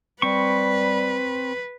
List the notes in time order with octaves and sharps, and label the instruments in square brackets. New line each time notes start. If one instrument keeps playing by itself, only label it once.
[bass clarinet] G3 [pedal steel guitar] C4 C#6 [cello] B4